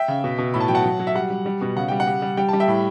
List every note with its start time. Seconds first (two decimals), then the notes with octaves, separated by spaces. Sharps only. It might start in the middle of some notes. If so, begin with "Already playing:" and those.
Already playing: E5 G5
0.08 C#3
0.24 B2
0.38 B2
0.54 A2 B5
0.60 A5
0.68 F#3 G5
0.75 F#5 A5
0.84 F#3
1.00 F#3
1.07 E5
1.15 G3 F#5
1.30 G3
1.46 G3
1.61 B2
1.76 C#3 F#5
1.88 G3 G5
2.00 F#5
2.07 G3
2.22 G3
2.37 G3 G5
2.49 G3 A5
2.60 E5 G5
2.68 A2